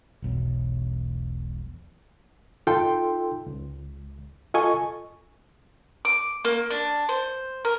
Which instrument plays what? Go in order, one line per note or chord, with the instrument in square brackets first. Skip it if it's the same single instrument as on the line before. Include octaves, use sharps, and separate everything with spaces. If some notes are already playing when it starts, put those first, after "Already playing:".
[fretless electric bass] E1 B1 E2
[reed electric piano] D#4 F4 A4 G5 C6
C#2
F4 A4 D#5 G#5 C#6
[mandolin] D6
A#3
D4
C5
A#4